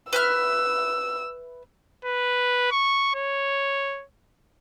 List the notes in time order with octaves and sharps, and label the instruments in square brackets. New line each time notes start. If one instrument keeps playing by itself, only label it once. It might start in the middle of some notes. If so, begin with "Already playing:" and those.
[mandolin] B4 E5 F6 [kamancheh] E6
[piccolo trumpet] B4
C#6
C#5